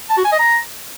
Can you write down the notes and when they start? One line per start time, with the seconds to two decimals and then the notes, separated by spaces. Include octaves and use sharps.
0.10 A5
0.17 F#4
0.25 G#5
0.32 D#5
0.39 A#5